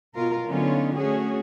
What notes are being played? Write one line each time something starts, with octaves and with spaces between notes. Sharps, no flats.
B2 F4 A#4
D3 F#3 B3 C#4 D#4 F4
A3 C#4 F#4 G#4